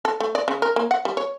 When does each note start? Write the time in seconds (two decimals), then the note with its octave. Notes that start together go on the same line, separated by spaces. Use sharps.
0.05 A4
0.20 A3
0.35 D5
0.48 C#3
0.62 A#4
0.76 A#3
0.91 F#5
1.05 G3
1.17 C#5